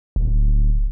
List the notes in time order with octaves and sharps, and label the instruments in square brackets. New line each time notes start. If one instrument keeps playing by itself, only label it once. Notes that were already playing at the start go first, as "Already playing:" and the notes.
[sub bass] D1